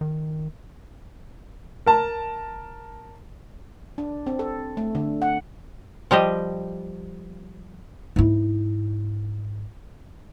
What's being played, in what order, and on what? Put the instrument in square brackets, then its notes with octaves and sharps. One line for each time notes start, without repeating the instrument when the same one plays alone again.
[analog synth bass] D#3
[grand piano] A#4 A5
[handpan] D4
C4
A4
A3
D3
F#5
[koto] F3 G3 G4 D#5
[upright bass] G#2 E4